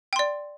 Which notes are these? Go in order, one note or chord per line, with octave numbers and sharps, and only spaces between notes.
D5 G5 C6